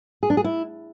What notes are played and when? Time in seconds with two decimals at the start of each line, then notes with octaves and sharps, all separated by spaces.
0.23 G#4
0.30 D4
0.37 G#4
0.44 E4